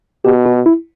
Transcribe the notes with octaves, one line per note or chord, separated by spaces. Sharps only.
B2 G4
F#4
E4